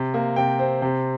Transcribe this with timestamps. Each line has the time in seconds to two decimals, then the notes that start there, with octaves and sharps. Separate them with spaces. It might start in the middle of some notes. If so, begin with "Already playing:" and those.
Already playing: C3
0.14 A#3
0.36 C3 G5
0.59 C4
0.82 C3